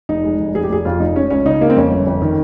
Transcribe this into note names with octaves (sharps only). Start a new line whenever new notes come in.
F1 D#4
G#3
F1
F1 G#4
G4
F1 G#4
F2 F4
F1 D#4
G#3 C#4
C#2 C#4
C#3 D#4
G#3 A#3
C4
F2 C#4
G1
F2
D#3